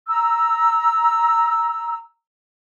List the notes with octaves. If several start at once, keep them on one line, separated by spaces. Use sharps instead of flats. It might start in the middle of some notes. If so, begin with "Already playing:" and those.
A#5 E6